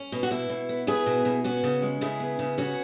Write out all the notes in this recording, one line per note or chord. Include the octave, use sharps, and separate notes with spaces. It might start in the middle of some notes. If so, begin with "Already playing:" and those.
Already playing: C#4
B2
F#4
B2 E4
B2
B3
B3 E4 G#4
B2
B2
B3 C#4 F#4
C#3
G#3
C#3 E4 G#4
B3
C#3
B3 C#4 F#4